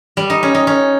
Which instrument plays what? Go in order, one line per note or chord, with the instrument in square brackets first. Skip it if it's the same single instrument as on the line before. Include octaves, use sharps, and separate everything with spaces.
[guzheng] G3
D#4
C#4
D#4
C#4